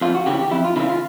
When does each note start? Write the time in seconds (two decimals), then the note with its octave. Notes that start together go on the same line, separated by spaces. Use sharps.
0.01 F2 F4
0.15 F#4
0.26 C#3 E3 G4
0.39 G4
0.51 F2 E4
0.65 F4
0.76 C#3 E3 E4
0.89 F4